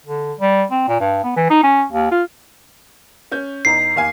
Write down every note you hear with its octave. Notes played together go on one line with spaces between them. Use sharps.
D3
G3
C4
A#2
G2
B3
E3
D#4
C#4
D#2
F4
C#4 G6
E2 D#4 A#5 C7
D#2 F5 G#5